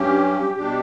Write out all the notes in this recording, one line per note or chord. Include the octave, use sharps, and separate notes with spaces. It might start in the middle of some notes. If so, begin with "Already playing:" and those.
Already playing: G2 F#3 C#4 G4
B2 G3 D4 G4